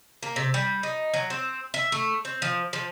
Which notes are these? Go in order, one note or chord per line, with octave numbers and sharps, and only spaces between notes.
A#3
C3
G3
D#4
F#3
C4
E5
A3
C4
F3
F3